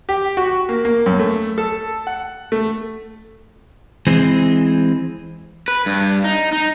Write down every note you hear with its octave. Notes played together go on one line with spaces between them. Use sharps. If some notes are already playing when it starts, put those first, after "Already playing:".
G4
F#4
A#3
A#3
F#2
A3
A4
F#5
A3
E3 G#3 C4
B4
G2
D#4
D#4